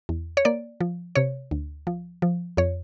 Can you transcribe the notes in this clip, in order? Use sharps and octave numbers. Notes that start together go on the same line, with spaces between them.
E2
C#5
A#3 D5
F3
C3 C#5
D2
F3
F3
F2 C#5